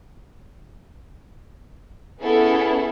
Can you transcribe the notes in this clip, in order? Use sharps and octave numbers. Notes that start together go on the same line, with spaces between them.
B3 C#4 E4 G#4 A4